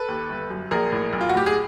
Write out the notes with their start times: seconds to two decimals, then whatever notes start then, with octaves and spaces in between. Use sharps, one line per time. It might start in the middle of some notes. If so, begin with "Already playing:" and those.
Already playing: A4 B4
0.08 D#2
0.29 G1
0.50 F#2
0.71 A#1 G#4 A#4
0.92 A2
1.13 B1
1.21 F4
1.29 F#4
1.34 A2 G4
1.46 G#4